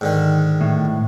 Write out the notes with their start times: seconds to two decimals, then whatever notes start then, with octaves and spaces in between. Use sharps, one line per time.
0.01 G#2 D3 D#3
0.61 A2